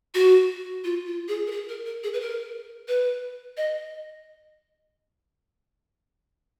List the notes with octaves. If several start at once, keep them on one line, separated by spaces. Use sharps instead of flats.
F#4
F4
F4
G#4
A#4
G#4
A#4
A#4
G#4
B4
A#4
B4
D#5